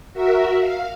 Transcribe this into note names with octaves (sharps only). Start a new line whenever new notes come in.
F#4 A#4 E5
F5